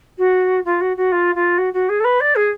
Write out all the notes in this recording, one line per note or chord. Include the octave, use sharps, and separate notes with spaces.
F#4
F4
F#4
F#4
F4
F4
F#4
F#4
G#4
A4
B4
D5
G#4